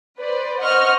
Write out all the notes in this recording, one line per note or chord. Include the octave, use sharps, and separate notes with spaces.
B4 C5 D5
C5 D#5 F#5 C#6 F6